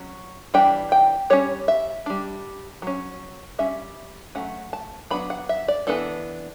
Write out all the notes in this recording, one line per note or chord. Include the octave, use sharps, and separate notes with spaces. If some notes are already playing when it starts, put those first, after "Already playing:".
Already playing: F#3 C#4
E3 G3 D4 G5
G5
G3 C#4 C#5
E5
G3 D4
F#3 C#4
G3 C#4 E5
F#3 A3 C#4 F#5
A5
F#3 B3 D4 B5
F#5
E5
D5
E3 B3 D4 A4